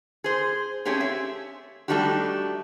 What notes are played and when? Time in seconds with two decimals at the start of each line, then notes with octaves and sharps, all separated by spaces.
0.24 G#4 C5
0.85 A3 C4 C#4 G4 G#4
1.00 E5
1.88 G3 A3 D4 D#4 F#4 G4